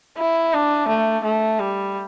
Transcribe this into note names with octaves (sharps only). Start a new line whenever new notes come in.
E4
D4
A3
A3
G3